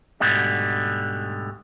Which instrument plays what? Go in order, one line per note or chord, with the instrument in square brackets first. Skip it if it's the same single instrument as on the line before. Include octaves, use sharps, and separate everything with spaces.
[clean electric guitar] D2 G#2 B2 D3 G3